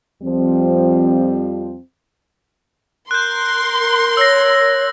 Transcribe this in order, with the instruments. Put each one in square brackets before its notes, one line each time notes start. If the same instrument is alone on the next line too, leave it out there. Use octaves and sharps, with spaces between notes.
[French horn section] F2 F3 G3 C4
[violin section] A#4 C6 [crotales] F#6 G6
[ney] C#5 [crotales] E6 A#6